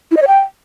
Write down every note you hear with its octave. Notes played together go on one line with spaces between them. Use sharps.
E4
D#5
C#5
G5